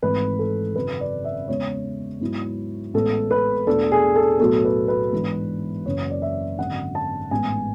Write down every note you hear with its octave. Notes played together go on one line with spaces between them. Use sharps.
G#1 G#2 E3 A3 B4
A4
G#1 F#2 C#3 B4
D5
E5
E2 C#3 G#3 B3 C#5
G#2 F#3 B3 E4
A1 A2 G#3 B3 A4
B4
E2 B2 A3 D4 A4
G#4
A4
B1 A2 F#3 B3 A4
B4
B4
G#2 E3 B3 D4
F#1 F#2 C#3 E3 C#5
D5
E5
G#1 F#2 D3 F#5
A5
A1 G#2 G#3 B3 G#5